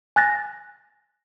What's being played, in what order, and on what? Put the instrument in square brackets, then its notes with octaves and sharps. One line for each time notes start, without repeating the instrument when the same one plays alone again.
[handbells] G#5 F#6 A6 A#6